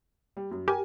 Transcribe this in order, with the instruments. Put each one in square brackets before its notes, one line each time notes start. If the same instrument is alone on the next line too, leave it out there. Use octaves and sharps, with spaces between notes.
[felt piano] G3
F#2
[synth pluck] G4 [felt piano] A#4 G#5